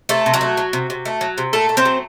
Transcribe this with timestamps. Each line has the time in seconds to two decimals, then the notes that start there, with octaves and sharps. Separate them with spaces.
0.09 C3 A3 A4
0.26 C3
0.34 F#3 F#4
0.41 A3
0.57 F#3
0.73 C3
0.90 C3
1.05 A3
1.21 F#3
1.38 C3
1.53 A#2 A3 A4
1.69 A3
1.77 C4 C5
1.85 F#3